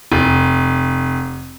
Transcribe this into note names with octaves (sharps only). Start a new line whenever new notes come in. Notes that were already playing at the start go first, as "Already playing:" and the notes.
F1